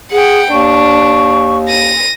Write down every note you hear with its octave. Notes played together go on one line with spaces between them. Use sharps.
G#4 F#5 G5
D#2 D4 C#6
A#6 D#7